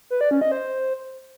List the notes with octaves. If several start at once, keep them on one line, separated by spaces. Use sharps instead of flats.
B4
D5
C#4
D#5
C5